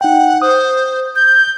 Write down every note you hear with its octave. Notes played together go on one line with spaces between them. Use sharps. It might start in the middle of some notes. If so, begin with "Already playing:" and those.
D#4 F#5 G5
C5 D#6
G6